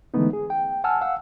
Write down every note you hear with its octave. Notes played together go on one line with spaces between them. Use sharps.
D3 E3 G#3 A3 B3 D#4
G#4
G5
F#5 G#5 A5 E6 F6
F5 F#5 E6